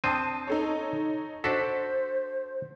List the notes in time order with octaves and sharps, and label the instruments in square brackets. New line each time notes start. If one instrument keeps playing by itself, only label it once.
[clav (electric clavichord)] C4 D4 C5 [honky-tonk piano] A5 D#6 D#7
[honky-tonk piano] D#4 A4 C#5
[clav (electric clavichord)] D4 F#4 A4 [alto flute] C5 [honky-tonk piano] B6